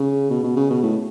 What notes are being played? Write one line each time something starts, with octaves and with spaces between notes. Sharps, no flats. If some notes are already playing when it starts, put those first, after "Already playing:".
Already playing: C#3
B2
B2
C#3
B2
A2